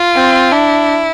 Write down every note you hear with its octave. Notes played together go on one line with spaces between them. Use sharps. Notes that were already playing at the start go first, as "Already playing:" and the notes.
Already playing: F4
C4
D4 E4